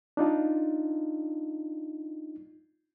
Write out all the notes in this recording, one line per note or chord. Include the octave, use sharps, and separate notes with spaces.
D4 D#4 F4